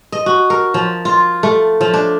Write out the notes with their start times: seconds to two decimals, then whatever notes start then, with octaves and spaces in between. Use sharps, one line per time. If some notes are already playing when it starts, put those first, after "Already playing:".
0.12 D#5
0.26 F#4
0.50 A#4
0.74 F3
1.05 F4
1.43 A3
1.81 F3
1.94 D4